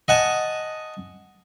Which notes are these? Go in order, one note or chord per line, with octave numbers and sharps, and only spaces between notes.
D#5 F#5 G#5 A5